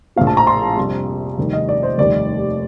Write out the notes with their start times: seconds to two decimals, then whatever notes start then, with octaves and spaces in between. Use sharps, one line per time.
0.16 A#1 A2 F3 F5
0.27 A5
0.37 A#5
0.47 C6
0.77 F2 C3 G3
1.38 F1 D#2 D#3 G3
1.53 D#5
1.69 D5
1.83 C5
1.98 F1 D#2 D#3 G3 D5